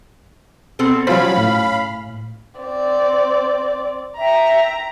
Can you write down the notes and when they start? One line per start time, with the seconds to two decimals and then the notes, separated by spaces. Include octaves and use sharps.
0.79 B2 C4 A4
1.07 C#3 F#3 C#4 F4 C5 F5 B5
1.37 A2
2.60 C4 D5
4.18 E5 G5 A#5